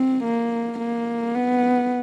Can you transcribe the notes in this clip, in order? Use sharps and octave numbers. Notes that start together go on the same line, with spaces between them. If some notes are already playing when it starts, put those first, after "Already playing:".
Already playing: C4
A#3
A#3
B3